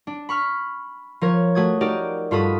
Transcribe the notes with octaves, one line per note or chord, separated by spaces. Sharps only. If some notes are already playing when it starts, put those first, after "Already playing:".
D4
B5 C#6 F6
F3 A#4 C#5
A3 F#4 D#6 G#6
D#4 F#4 G4 A#4 D5
G2 F4 F#4 A4 B5 D#6